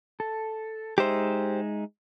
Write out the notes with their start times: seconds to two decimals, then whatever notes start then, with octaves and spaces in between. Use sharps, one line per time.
0.20 A4
0.98 G#3 D#4 G4 C5 E5